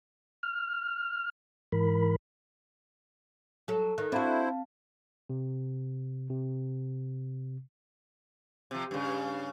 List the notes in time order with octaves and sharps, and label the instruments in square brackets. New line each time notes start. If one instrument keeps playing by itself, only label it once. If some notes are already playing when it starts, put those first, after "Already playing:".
[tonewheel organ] F6
G#2 E3 A#4 B5
[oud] F#3 A4
[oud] D#3 [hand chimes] F#6
[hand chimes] C4 F5 A5 [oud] D4 F#4 [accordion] E4 C5
[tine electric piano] C3
C3
[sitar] C3 F3
G2 C#3